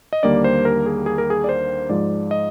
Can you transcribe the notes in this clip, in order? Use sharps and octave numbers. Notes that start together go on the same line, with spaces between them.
D#5
D#2 D3 G3 A#3 D5
C5
A#4
G#4
G#4
A#4
G#4
D5
C5
G#2 F3 G#3 D5
D#5